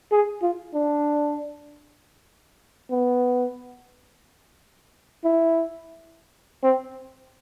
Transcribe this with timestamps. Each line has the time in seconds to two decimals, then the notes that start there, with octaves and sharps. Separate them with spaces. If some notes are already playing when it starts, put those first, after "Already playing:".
0.12 G#4
0.42 F4
0.74 D4
2.90 B3
5.24 E4
6.63 C4